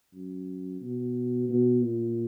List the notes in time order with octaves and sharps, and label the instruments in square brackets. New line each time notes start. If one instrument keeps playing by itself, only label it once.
[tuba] F#2
B2
B2
A#2